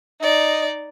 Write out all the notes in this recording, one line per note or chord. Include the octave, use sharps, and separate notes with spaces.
D#4 D5 D#5